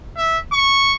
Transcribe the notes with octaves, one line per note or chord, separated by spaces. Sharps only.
E5
C#6